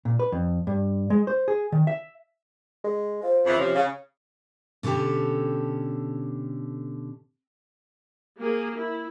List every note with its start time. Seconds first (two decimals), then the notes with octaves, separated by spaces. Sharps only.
0.05 A#2
0.19 B4
0.32 F2
0.67 G2
1.10 G#3
1.27 C5
1.48 G#4
1.72 D#3
1.87 E5
2.84 G#3
3.23 F4 C5
3.46 F2 C#3 E3
3.58 C3 F3 C#4
3.75 C#3 F5
4.83 B2 D3 C#4 G4 A4
8.39 A#3 G#4
8.77 E4